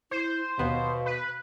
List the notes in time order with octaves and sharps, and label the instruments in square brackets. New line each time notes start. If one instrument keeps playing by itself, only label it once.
[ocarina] E4 [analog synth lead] C5
[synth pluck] D#2 B3 [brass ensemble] B2 [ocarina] F5
[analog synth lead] B4